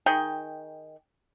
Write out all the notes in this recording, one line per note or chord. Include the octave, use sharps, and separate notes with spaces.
D#3 G#4 G5